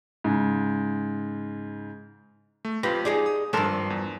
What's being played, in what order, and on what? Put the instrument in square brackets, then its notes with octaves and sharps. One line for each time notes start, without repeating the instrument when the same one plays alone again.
[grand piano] G#2 C#3
[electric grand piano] A3
[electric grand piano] F2 F4 A#6 [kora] G4 [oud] B4
[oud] D#4 G#4 D5
[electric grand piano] D#6
[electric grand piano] G#1 C6 E6 [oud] G2 F3 [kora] D4 A4 A#4
[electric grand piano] E2